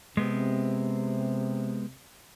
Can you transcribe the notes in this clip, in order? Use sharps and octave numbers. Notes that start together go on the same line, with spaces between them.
C3 G#3 B3 C4